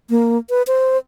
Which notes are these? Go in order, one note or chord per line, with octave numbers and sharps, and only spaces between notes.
A#3
B4
C5